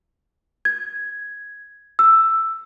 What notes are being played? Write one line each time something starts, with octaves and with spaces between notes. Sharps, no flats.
G#6
E6